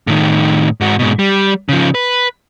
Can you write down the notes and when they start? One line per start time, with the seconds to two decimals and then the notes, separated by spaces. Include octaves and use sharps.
0.07 A2 D#3
0.81 G#2 F#4
0.99 G#2 B2
1.19 G3
1.69 C#3 F3
1.95 B4